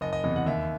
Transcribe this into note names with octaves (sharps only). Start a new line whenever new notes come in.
F#1 D#5
D#5
E2 C3 E3 D#5
F#5
D#2 E5